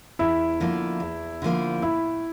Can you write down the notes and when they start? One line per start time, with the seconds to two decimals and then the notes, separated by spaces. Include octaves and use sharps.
0.19 E2 E4
0.60 D3 F3 A#3
1.00 E2
1.42 D3 F3 A#3
1.82 A2 E4